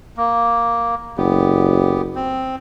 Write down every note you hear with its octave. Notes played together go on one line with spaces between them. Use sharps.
A#3
F#1 B3 G4
C4